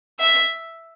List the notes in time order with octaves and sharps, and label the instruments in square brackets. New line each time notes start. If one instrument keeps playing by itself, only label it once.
[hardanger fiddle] E5